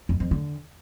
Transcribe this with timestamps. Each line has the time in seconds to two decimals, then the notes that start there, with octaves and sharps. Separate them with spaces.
0.09 F2
0.20 F2
0.31 D3